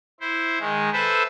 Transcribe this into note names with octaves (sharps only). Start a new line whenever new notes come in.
E4 C5
D#3 G#3
A4 B4 C5 E5